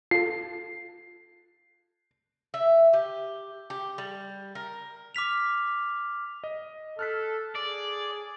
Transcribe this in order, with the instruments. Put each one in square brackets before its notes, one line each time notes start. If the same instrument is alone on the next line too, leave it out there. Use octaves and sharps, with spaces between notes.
[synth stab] F4 A4 [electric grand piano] C7
[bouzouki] E5
G4
G4
G3
A#4
[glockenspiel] D6 F6 B6 F7
[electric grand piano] D#5
[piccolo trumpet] A4 [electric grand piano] F6 F#6 B6
[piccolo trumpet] G#4 [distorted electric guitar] D5